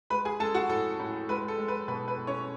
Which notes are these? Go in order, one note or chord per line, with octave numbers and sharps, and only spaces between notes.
G#3 B4 B5
G#4 G#5
G#3 A4 A5
F#4 F#5
A2 A4
A2
G#3 B4
A4
G#3
B4
B2 B4
B4
B2
C#4 C#5